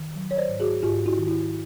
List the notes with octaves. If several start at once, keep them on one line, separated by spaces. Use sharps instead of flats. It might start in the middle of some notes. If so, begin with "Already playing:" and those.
Already playing: D#3
F#3
C#5
C5 D5
G#2
F#4 G#4
G#2 F4 G4
E4 F#4
D#3
E4